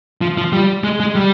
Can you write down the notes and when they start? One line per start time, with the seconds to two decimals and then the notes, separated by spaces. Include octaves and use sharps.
0.21 F3
0.38 F3
0.53 G3
0.84 G#3
1.00 G#3
1.15 G3